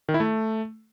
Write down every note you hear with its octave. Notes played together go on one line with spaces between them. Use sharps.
D#3
E4
A3